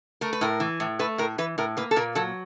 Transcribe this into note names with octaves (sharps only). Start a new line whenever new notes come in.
A3 A#4
B4
A2 A#4
E3
A2
A3 B4
A2 A#4
E3 B4
A2 A#4
A#3 B4
A4
A#2 A#4
F#3 A4